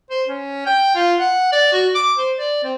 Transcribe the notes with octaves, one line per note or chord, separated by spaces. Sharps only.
C5
C#4
G5
F4
F#5
D5
F#4
D6
C5
D5
C4